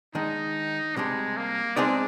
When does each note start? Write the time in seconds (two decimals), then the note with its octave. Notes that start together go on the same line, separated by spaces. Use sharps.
0.15 D#3 G#3 D4 D#4
0.96 C3 G3 G#3 D4
1.37 A#3
1.76 G#3 C4 D4 D#4 G#4 D5